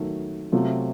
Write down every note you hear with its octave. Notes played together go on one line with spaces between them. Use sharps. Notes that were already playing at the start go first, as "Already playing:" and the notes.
Already playing: D#3 F#3 A3
C3 F#3 A3 C4 F4